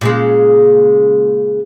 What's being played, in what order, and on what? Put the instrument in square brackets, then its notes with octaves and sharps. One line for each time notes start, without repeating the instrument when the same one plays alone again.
[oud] A#2 C#3 G#3